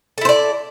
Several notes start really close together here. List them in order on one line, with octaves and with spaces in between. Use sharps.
A4 E4 C5 D5